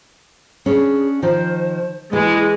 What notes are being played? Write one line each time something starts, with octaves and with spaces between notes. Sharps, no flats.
C#4 D4 G#4
D#3 F3 C5
E3 G#3 E4